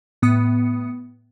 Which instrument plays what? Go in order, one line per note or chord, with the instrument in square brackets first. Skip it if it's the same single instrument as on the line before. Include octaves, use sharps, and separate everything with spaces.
[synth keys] A2 B3 B5 D#6 C#7